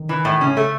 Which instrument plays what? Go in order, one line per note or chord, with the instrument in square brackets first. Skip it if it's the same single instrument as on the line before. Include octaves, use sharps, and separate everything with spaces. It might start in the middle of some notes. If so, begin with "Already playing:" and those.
Already playing: [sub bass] D#3
[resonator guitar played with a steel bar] E3
A2
[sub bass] C#3 [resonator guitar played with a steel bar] C#4
[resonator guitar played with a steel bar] A3